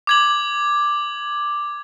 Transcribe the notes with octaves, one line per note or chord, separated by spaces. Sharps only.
D6 G#6 F#7